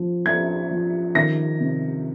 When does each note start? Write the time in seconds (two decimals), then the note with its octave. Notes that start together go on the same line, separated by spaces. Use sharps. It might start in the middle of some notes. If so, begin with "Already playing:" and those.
Already playing: F3
0.25 F3 G#6
0.71 F3
1.15 D#3 A#6
1.60 C3